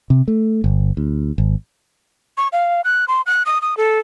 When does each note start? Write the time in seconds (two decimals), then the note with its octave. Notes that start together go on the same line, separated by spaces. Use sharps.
0.10 C3
0.28 A3
0.64 G1
0.97 D2
1.38 G#1
2.38 C#6
2.53 F5
2.84 F#6
3.08 C6
3.26 F#6
3.46 D#6
3.62 D#6
3.77 A4